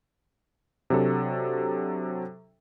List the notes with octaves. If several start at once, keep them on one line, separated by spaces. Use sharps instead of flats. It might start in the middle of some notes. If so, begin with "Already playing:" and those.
C3 F#3 D4 A4